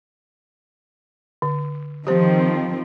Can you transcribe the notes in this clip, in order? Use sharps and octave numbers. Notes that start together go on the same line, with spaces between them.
D3
D#3 F3 C4 G4 C5